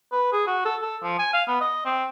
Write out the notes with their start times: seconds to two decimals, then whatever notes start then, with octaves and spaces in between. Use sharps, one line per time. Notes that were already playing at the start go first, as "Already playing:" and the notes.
0.12 B4
0.32 G#4
0.47 F#4
0.65 A4
0.82 A4
1.03 F3
1.19 G#5
1.33 F5
1.48 B3
1.61 D#5
1.85 C4